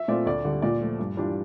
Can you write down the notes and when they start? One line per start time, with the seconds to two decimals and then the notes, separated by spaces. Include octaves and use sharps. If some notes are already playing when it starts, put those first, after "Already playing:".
Already playing: E5
0.08 A#2 A3 C4 F4 D5
0.26 D2 D5
0.45 D3 G3
0.62 A#2 D5
0.81 F3 A3
0.99 G2
1.17 E3 G3 D4 F4